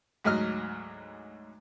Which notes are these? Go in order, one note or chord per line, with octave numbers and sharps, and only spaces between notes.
D2 G#2 F#3 D#5 F6